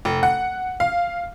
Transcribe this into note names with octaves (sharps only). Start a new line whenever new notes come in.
F1
F#5
F5